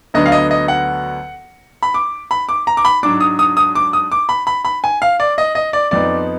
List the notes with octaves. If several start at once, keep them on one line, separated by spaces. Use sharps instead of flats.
D2 D3 F#3 B3 D4 D#5
F5
D#5
D#5
F#5
B5
D6
B5
D6
A#5
D6
B5
G#2 F#3 D4 D6
D#6
D#6
D#6
D6
D#6
D6
B5
B5
B5
G#5
F5
D5
D#5
D#5
D5
F2 F3 B3 D#4 D5